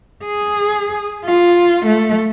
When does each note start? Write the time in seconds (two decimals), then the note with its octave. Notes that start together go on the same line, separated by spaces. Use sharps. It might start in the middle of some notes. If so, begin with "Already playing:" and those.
0.25 G#4
1.24 F4
1.86 A3